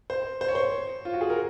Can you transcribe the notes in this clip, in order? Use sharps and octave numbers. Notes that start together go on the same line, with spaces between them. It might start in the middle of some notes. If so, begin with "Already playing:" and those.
C5
C5
C#5
C5
F4
F#4
G#4
A#4